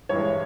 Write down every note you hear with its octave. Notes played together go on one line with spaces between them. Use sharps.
G2 E3 G#3 C#5